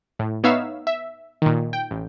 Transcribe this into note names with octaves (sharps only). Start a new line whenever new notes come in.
A2
B3 D#4 C#5 E5 F5 E6
E5
A#2 D#3
G5
A1